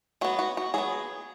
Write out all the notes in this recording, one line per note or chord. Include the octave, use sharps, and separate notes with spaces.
F#3 B3 F#4
F#4
F#4
F#3 B3 G#4